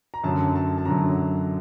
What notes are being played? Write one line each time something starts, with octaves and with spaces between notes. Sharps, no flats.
A#5
F#2 D3 F#3 A5
A5
A5
F#2 D3 F#3 A#5